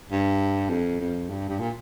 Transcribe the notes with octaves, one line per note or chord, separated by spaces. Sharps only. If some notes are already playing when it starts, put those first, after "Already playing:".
G2
F2
F2
G2
G2
A#2